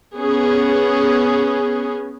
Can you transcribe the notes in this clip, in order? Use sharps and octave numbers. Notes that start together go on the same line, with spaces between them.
B3 C#4 G#4